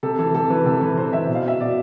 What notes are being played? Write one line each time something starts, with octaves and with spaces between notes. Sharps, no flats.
C3 A4
E3 A4
C3 A4
E3 B4
C3 A4
E3 B4
C3 C5
E3 E5
B2
F5
E5
B2 D5